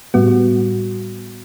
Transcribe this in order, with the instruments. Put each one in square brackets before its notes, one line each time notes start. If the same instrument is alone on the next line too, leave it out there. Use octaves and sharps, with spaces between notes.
[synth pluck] A2 G3 B3 F#4